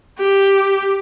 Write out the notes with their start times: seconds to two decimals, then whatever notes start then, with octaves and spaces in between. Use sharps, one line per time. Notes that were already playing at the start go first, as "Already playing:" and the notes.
0.19 G4